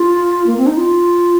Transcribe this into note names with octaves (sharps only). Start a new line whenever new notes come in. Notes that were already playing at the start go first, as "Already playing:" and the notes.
Already playing: F4
A#3
C4
D#4
F4